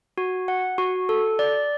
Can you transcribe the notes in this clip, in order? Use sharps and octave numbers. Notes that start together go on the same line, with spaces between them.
F#4
F#5
F#4
A4
D5